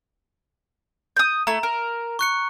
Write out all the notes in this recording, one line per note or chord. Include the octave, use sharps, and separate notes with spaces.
D#6 G6
A3 E4 A#5
A#4
C#6 F#6 C#7